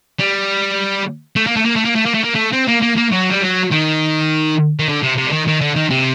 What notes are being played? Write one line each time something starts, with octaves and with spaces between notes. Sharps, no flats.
G3
A3
A#3
A3
A#3
A3
A#3
A3
A#3
A3
A#3
A3
C4
A#3
A#3
A#3
F#3
G3
F#3
D#3
D#3
D3
C3
C3
D3
D#3
D#3
D3
D#3
C3